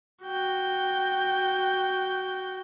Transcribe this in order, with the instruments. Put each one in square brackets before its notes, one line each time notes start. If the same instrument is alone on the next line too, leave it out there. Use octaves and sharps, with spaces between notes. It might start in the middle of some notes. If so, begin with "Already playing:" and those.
[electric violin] F#4 G5